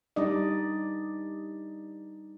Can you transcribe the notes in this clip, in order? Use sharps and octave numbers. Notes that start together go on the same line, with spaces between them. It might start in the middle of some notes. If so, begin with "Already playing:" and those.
G3 D4 D#4 D5 D#5